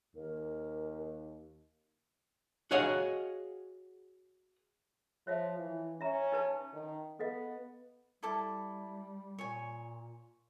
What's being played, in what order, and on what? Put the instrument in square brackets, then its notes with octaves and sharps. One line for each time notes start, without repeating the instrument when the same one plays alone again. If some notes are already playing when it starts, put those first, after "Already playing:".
[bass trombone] D#2 [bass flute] A#4
[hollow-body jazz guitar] F#4 G#4 C#5 D#5 F5 F#5
[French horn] F3 [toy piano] C#5 E5 F5
[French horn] E3
[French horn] C#4 [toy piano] E5 A#5
[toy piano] D#4 B4 A5
[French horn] D#3
[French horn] B3 [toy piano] A4 D#5 F5
[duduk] G3 [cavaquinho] E4 A4 D6
[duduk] A#2 [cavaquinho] C#5 G#5